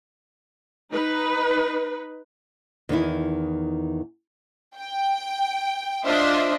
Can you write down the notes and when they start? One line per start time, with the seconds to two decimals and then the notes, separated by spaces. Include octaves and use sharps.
0.92 D#4 B4
2.89 E2 D#3 D#4 E4
4.76 G5
6.06 D4 F4 C5 D#5 E5